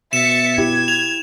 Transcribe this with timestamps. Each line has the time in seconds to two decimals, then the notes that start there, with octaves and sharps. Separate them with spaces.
0.13 B2 E5 A6 C#7 E7
0.58 E4 G4 G#6
0.88 F7